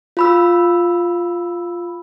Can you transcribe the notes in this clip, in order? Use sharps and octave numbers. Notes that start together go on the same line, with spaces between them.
F4 B5 E6